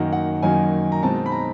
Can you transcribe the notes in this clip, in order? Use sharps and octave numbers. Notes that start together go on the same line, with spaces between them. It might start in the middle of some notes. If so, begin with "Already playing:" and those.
Already playing: F#2 D#3 F#3 A#3 D#4 F#5
F#5
F#2 D#3 F#3 A#3 D#4 G#5
A#5
B2 G#3 C4 D#4 A5
B5
A#5